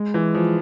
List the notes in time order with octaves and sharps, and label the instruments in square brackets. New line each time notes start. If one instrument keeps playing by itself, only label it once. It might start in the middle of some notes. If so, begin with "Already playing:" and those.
Already playing: [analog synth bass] G#3
[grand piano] E3
F3